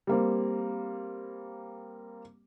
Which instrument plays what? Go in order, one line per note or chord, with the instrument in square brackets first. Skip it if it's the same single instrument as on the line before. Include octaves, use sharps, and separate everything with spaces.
[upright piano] G3 A#3 C4